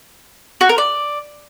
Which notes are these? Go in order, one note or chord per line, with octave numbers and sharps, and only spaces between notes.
F#4
A#4
D5